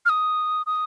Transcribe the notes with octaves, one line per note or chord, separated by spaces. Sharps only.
F6
D#6
D#6